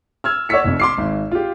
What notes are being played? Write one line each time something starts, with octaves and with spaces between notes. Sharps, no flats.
E6 F6 G#6
C#5 D5 F#5 E6 B6 C#7
F1 F2
C6 D6 C7
G#1
F4 G4